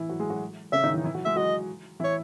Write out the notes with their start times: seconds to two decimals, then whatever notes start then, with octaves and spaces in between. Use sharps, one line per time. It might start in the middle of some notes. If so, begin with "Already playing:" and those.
Already playing: E3 E4
0.09 F#3 F#4
0.19 G#3 G#4
0.30 F#3 F#4
0.72 C#3 C#4 E5
0.84 D#3 D#4
0.94 E3 E4
1.04 E3 E4
1.15 F#3 F#4
1.25 G#3 G#4 E5
1.36 F#3 F#4 D#5
2.00 E3 E4 C#5